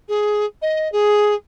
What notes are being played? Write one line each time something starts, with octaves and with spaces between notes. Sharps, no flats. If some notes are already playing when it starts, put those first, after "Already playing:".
G#4
D#5
G#4